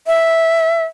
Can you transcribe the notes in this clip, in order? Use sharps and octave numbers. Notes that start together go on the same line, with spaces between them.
E5